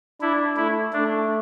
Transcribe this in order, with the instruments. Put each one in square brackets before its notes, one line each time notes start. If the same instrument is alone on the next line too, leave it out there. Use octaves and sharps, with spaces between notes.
[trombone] D4 [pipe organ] E4
[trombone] A3 [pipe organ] E4
[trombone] A3 [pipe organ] D4